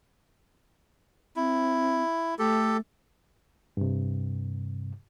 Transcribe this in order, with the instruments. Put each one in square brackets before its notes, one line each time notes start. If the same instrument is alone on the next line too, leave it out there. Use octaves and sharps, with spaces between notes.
[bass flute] C4 [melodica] E4
[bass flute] A3 [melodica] G4 A4
[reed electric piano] G2 C3